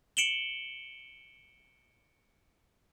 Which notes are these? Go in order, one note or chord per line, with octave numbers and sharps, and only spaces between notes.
C#7 D7 E7 F#7 G7